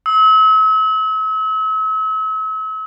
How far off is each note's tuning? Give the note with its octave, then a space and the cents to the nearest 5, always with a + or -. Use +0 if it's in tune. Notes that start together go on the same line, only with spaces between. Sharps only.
E6 -40